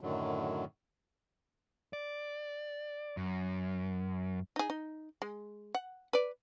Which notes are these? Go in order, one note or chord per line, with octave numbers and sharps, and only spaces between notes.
F#2 A2 D3 D#3 F#3
D5
F#2
D#4 G#4
D#4
G#3
F#5
B4 D5